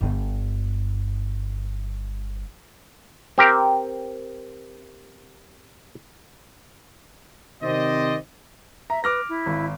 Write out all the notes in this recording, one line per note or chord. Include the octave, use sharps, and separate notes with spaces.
G1 G2
C4 G4 A#4
C3 D#3 C4 C5 D5 D#5
E5 A#5
B4 D6 F6 A#6
E4
G#1